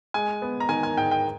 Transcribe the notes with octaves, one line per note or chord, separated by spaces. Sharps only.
G#3 G#5
B3
A#5
D#3 G#5
G#5
G#2 G5
G5